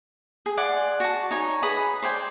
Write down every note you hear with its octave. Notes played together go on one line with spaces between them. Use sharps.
G#4
D5 F#5 G#5 C6
F#4 A5
D#4 C#5 G#5
G#4 B4 B5 D#6
C5 D5 G5 G#5